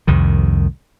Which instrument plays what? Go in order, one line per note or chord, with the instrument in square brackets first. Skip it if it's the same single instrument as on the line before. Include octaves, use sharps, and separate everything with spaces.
[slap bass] C2 F2 D#3